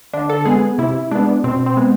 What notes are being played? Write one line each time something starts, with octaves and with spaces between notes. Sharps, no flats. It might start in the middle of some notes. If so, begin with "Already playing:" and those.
D3 D4
A4
G#3 B3 G#4
C3 E4
G#3 B3 D4
B2 C4
C4
G#3 B3